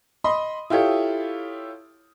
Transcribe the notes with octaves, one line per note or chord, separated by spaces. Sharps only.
D#5 B5 C6 D#6
E4 F4 G4 A4 C#5